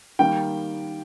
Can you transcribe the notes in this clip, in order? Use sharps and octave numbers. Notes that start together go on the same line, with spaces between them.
D#3 G3 A#3 G5